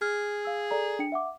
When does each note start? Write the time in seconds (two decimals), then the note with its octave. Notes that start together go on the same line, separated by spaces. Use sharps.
0.02 G#4 F6
0.45 F5 E6
0.71 A4 D5 A#5
0.99 D4 G5 C#7
1.12 E5 F#5 D6